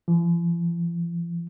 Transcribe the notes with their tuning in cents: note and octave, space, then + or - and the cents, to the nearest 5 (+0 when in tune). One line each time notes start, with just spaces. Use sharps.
F3 -45